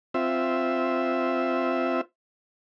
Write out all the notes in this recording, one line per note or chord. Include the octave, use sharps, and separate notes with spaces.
C4 F4 E5